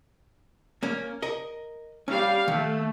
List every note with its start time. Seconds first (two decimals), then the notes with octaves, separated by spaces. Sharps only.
0.83 A#3 C#4
1.22 A#4 D#5
2.08 G3 C#4 F5
2.48 D#3 A3